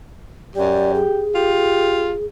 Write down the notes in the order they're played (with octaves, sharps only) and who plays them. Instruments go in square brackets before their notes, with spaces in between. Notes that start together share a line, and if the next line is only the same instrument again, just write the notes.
[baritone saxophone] F#2 [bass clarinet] G4 [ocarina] D5
[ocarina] G#4
[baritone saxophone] F4 [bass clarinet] G4